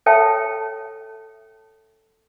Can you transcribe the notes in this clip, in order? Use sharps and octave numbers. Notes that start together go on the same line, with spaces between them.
A4 C#5 E5 G5 A5